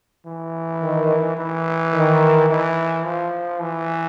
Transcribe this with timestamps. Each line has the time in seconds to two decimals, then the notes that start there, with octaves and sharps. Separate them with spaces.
0.26 E3
0.82 D#3
1.37 E3
1.94 D#3
2.49 E3
3.05 F3
3.61 E3